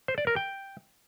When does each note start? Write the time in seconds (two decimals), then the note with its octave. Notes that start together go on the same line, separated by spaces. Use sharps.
0.08 C5
0.18 D5
0.27 A#4
0.36 G5